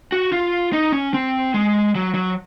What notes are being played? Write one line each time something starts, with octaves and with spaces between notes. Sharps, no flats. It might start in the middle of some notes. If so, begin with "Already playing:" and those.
F#4
F4
D#4
C#4
C4
G#3
F#3
F#3